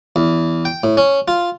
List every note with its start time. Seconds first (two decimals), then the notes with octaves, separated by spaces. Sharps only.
0.16 E2
0.65 G5
0.84 A2
0.97 C#4
1.28 F4